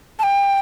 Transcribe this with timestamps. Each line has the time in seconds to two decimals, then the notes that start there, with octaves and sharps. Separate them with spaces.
0.19 A5
0.23 G5